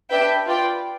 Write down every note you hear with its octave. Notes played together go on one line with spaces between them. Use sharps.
D4 G4 B4 E5 G5
F4 B4 D5 G5